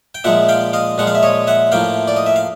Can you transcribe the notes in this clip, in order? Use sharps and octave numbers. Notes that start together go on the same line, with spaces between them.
G5
A#2 F3 G#3 E5 F#5
F5 G5
D#5 F5
A#2 F3 G#3 F#5
F5
E5
C#5 D#5
E5 F#5
A2 F3 A#3 F5 G5
D5
D#5
E5
F5